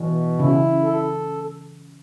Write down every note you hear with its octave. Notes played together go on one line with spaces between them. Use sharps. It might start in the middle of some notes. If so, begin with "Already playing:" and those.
Already playing: B2 E3
C#3 E4
A4